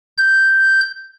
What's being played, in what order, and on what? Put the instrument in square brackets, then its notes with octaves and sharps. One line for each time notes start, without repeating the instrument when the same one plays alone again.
[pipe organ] G6